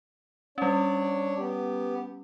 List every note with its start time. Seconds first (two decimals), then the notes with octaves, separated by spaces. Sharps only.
0.58 G3 C#4 D4 C#5 D5
1.38 B3 G4